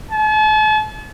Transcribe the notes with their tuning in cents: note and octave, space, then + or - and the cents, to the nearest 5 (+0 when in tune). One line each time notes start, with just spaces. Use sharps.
A5 -40